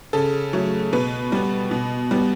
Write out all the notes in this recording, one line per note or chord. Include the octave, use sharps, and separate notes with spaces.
C#3 A4
F#3 A3
B2 B4
G3 B3
B2
G3 B3